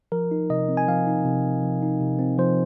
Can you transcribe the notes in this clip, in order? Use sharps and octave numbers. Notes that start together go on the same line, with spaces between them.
F3 A#4
D#4
C3 D#5
C4
G#5
F3 F5
D#4
C3
C4
F3
D#4
C3
C4
F3 C5